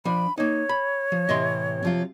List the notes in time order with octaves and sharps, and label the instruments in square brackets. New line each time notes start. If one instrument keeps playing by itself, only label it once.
[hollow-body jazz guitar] F3 D4 [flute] B5
[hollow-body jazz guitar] A#3 D#4 [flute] C#5
[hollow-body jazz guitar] B5
F3
[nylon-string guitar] A2 C3 E3 [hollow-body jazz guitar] D#5 E5 C6
[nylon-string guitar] C3 F3 F4